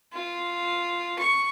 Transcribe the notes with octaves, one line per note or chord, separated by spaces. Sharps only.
F4
C#6